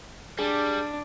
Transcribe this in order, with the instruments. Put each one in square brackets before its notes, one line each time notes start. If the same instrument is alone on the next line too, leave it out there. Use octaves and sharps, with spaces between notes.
[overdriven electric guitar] G3 [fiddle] D4 [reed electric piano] G#4